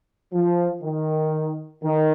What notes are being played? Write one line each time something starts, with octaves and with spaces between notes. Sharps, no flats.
F3
D#3
D#3